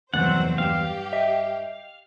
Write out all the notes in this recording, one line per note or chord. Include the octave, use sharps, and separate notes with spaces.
F1 E2 G2 F#3 C4 C5 F#5 A6
G2 G4 F5 E7
D#5 E5